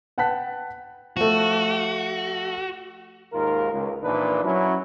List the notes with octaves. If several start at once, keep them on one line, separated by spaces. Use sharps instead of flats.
B4 F#5 G5 A5 F#6 B6
F3 A3 F#4
D#2 G#2 F4 A#4
C#2
A#1 A#2 E3 D4 D#4 B4
F#3 C#4 E4